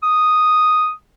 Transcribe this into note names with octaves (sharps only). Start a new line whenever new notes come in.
D#6